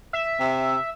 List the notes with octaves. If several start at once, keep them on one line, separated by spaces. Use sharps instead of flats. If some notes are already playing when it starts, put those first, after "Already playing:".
E5
C3